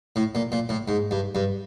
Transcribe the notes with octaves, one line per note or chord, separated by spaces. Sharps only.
A2
A#2
A#2
A2
G#2
G2
G2